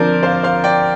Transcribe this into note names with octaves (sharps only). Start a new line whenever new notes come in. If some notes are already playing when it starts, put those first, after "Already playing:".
Already playing: D3 F3 C4 F4 A#4 C5 D5
C5 F5
C5 F5
D5 G5